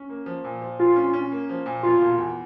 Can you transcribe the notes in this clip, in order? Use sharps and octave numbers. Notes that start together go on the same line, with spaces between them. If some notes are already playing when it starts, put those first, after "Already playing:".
Already playing: C#4
A#3
F3
A#2
F3
A#2 F4
C#4
C#4
A#3
F3
A#2
E1 F4
E1
E2